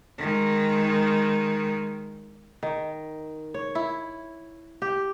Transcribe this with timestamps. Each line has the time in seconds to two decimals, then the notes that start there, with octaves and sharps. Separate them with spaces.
0.18 D#3 G#3
2.63 D#3
3.54 C#5
3.75 E4
4.82 G4